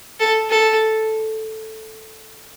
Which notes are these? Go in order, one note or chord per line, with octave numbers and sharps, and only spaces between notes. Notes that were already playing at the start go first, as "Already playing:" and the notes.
A4
A4